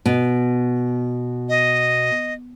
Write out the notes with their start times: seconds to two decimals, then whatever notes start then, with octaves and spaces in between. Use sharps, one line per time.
0.06 B2
1.49 D#5